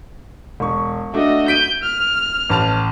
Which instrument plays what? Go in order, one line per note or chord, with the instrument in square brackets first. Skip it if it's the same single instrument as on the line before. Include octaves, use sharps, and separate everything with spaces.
[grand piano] E1 C#6
[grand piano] A3 D4 [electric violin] F#4 D#5
[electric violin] G6 [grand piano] B6 D7 D#7
[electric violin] F6
[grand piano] A1 A5 F7